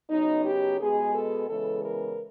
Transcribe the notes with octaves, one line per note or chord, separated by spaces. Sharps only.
C#3 F#3 B3 D#4
G4
B2 G#3 B3 G#4
A4
E2 C#3 E3 G#3 B3 A4
A#4